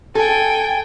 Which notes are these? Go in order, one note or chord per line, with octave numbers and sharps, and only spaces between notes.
A4 G5 G#5